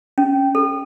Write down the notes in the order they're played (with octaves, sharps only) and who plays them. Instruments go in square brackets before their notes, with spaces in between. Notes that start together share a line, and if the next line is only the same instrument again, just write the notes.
[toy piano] C#4
A4